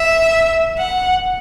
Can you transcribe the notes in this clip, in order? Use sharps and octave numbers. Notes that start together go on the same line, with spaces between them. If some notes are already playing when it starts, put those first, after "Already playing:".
Already playing: E5
F#5